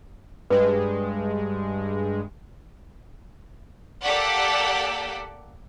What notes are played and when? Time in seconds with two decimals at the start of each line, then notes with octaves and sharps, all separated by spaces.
0.50 G2 G#3 B4
4.03 A#3 G4 A4 D5 F#5 B6